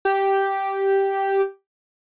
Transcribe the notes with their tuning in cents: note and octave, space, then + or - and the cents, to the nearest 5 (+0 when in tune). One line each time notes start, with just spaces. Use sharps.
G4 -5